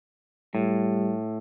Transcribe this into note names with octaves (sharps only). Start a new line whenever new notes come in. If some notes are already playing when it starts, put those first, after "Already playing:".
A2 G3